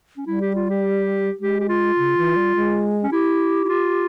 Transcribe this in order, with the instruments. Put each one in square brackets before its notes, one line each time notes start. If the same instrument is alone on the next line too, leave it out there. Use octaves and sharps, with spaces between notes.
[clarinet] C#4
[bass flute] G3 [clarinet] E4
[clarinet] G4
F4
G4
[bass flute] G#3 [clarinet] G4
[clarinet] G4
F4
[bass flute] C#3
E3
G3
G#3
[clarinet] C#4
[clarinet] E4 [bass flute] G4
[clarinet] E4
F4